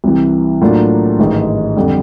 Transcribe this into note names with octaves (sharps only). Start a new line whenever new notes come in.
C2 C3 E3
A2 F#3 A#3 D4 F4
A1 G#2 D#3 G#3
F2 D3 G3